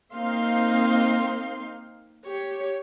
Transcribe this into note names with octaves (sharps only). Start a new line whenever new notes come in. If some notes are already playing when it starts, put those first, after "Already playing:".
A#3 C4 D#4 F5 C6
G4 C#5